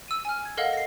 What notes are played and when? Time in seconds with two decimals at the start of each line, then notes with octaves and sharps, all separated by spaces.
0.08 E6 D#7
0.25 G#5 F6
0.45 G#6
0.57 A4 A#4 D#5 F5 F#5
0.73 A#6 C7